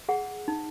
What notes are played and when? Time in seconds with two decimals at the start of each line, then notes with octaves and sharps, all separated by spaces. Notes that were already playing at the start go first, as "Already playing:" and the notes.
0.09 G#4 F#5
0.48 D#4